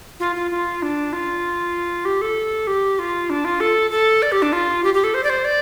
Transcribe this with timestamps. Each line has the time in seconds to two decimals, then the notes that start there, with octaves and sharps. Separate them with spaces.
0.20 F4
0.36 F4
0.51 F4
0.82 D4
1.13 F4
2.05 G4
2.21 A4
2.67 G4
2.99 F4
3.30 D4
3.45 F4
3.60 A4
3.91 A4
4.22 D5
4.32 G4
4.42 D4
4.52 F4
4.84 G4
4.94 G4
5.04 A4
5.14 C5
5.23 D5
5.29 C5
5.45 D5